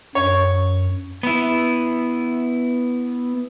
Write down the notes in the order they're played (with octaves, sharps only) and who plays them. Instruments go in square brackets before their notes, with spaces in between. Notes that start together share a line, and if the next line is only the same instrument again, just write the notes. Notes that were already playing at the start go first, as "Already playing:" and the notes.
[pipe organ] F#2 [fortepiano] C#5
[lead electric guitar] B3 E4